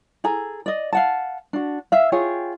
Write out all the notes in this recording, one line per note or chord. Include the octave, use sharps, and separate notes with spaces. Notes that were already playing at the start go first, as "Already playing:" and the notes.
G#4 A4 G#5 A#5
D5 D#5
F5 F#5 A5
D4 F#4
E5 F5
F4 G#4 C#5 G5